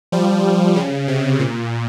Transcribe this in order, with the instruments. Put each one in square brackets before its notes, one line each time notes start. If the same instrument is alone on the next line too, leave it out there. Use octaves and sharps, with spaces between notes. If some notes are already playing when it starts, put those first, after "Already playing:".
[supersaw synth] F3 G3
C#3
C3
A#2